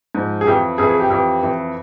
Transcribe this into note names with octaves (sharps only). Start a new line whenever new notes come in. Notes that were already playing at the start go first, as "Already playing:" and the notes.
G#2 F3
G#4
F2 E3 G4
F2 E3 G#4
G#4
G4
F2 E3 G4
F2 E3